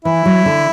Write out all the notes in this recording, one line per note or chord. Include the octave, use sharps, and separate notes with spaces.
E3 E4
F#3
D3